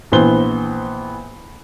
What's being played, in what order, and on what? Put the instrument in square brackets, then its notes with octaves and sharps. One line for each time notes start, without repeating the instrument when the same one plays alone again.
[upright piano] A#1 E3 B3 C5 G7